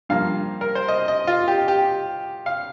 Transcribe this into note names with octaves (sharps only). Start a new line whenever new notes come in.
G2 F3 A#3 F5
A#4
C5
D#5
D#5
F4
G4
G4
F5